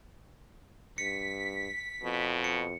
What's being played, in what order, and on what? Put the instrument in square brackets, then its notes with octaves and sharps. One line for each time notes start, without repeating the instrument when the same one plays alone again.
[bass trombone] G2 [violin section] B6 [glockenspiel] C#7
[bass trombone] F2 [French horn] B2
[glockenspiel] C#7